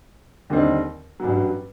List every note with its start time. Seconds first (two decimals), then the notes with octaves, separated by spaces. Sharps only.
0.50 D#2 D3 G3 C4 D#4
1.20 A1 G2 F#3